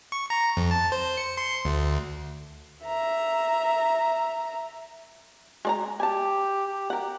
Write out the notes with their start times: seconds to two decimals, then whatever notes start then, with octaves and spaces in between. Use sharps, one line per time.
0.12 C#6
0.30 A#5
0.57 F2
0.71 A5
0.92 C5
1.17 C#7
1.37 C6
1.65 D2
2.85 E5 A#5
5.65 G#3 D5 A#5
6.00 G4 G#5 A5
6.67 G4
6.90 G4 A#4 F#5